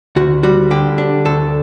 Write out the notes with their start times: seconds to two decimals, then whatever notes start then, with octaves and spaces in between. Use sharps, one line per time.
0.16 D2 F#4
0.43 G3 F#4
0.71 D3 G4
0.98 D4
1.25 D2 A4